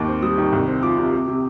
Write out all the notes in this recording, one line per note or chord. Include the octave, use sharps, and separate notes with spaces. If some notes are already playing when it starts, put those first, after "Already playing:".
Already playing: D#2 D#3 D6
C4
G3 D#6
D#3
C2
C4
F3 D6
C3
C3
C3